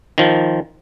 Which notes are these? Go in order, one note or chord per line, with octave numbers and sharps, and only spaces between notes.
D#3 F3